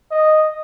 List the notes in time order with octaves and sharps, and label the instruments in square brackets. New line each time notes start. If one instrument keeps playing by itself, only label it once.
[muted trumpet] D#5